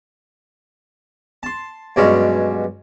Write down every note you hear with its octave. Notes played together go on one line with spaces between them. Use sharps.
A5 C6
G2 B2 F#3 G#3 C#4